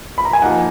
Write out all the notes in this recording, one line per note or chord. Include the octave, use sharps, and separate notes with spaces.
B5
A#5
G#5
F3 A#3 D#4 F#5